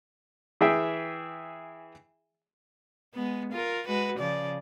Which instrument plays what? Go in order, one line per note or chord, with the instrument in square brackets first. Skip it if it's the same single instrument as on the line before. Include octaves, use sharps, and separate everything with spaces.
[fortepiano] E3 G#4 E5 G5
[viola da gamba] G#3 B3
F4 A#4
G#3 F#4 B4
C#3 F3 D5